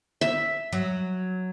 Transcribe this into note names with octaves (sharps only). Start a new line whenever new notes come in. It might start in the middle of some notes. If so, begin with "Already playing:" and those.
E5
F#3